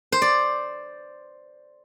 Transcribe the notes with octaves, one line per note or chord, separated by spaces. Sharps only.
C5
D5